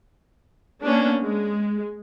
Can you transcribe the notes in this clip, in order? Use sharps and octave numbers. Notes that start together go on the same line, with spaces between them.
A#3 B3 C#4 D4
G#3